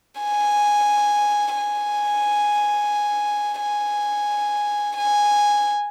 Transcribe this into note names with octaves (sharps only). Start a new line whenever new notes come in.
G#5
G#5
G#5
G#5